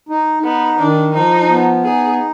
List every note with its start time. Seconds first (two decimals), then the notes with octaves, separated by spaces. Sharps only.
0.09 D#4
0.43 B3 D#4
0.79 D#3 D4
1.13 F3 D#4
1.49 B3
1.84 D#4 G#4